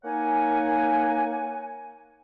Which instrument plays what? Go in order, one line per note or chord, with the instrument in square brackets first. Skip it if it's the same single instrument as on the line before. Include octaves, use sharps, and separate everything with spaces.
[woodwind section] A#3 D#4 C#5 F#5 G#5